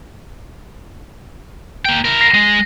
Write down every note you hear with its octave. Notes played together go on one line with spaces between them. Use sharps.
A#3 G5
E4 A#4
A#6 C7
G#3